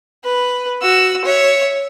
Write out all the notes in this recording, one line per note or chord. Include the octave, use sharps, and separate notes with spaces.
B4
F#4 E6
C#5 E5